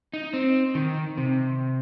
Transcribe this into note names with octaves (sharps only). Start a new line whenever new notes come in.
D#4
C4
D#3
C3